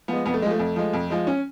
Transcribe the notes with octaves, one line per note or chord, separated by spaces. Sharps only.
F3 G#3 B3
F2 B3
A3
G#3
F3 A3
F2
F3 G#3
F2
F3 G#3
C#4